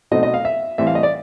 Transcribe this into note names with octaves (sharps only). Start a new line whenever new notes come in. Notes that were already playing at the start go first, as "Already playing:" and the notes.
B2 F#3 A3 C4 D#4 D#5
D#5
F5
E5
A2 E3 G3 C4 E5
F5
D#5
D5